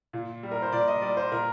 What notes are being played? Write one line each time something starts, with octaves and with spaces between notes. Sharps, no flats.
A#2
G3
A#4
C5
A#2 D5
D#5
G3 D5
C5
A#2 A#4